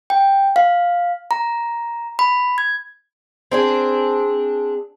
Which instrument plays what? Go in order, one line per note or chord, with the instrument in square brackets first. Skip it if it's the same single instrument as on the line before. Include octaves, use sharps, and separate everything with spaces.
[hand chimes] G5
F5
A#5
B5
G#6
[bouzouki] C4 D4 G#4